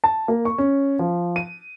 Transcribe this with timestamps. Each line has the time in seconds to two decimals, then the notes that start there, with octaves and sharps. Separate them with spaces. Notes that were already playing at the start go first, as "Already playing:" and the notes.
0.04 A5
0.28 A#3
0.45 C#6
0.58 C#4
0.99 F3
1.36 D#7